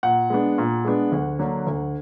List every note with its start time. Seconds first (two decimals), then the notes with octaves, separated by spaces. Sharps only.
0.03 A#2 F#5
0.30 G#3 B3 D4
0.58 A#2
0.85 G#3 B3 D4
1.12 D2
1.39 D3 F#3 A#3 D4
1.67 D2